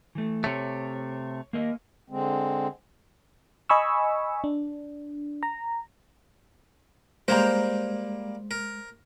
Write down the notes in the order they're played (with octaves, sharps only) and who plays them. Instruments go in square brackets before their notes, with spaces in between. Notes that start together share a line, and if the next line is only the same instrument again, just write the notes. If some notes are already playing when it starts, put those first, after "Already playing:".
[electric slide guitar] E3 A3
[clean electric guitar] C3 A3 [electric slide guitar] C#5
[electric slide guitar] A#3 A#4 D#5
[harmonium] D3 G#3 C4
[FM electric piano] D#5 G#5 B5 C#6 E6
D4
A#5
[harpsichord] G3 A#3 A#4 [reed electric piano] G#3 [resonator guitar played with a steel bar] C5 A#5
[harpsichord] A#4